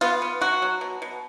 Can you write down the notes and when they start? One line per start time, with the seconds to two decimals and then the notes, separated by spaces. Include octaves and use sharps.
0.01 B3 F4
0.22 B3
0.41 F#3 F#4
0.62 F#3
0.81 B2
1.02 B2